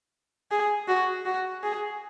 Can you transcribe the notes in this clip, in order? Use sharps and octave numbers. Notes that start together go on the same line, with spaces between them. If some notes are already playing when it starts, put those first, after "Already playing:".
G#4
F#4
F#4
G#4